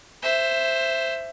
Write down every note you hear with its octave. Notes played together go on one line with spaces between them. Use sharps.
C5 E5